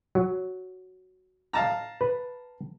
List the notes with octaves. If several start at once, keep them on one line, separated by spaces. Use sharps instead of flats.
F#3
F5 A5 A#5
B4